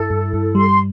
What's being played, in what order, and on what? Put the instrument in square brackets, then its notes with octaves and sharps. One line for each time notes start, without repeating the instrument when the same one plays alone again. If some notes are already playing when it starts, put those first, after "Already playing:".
Already playing: [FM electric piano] G2 E4 [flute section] A4
[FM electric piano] G2
G2
[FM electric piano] G3 [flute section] C6